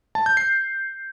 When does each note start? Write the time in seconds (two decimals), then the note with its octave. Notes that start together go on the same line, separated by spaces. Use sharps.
0.15 A5
0.26 G6
0.37 C7